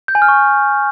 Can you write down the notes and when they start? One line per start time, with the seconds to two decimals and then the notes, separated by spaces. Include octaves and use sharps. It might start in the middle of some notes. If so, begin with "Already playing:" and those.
0.08 G6
0.15 G#5
0.22 F6
0.28 C#6